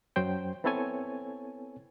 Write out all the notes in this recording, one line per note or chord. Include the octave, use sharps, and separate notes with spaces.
F#2 F#3 C5 G5
B3 C4 E4 A4 C#5 G#5